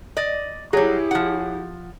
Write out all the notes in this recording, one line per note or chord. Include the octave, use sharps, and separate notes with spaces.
D5 D#5
F#3 G3 E4 G4 G#4 C#5
F3 F#5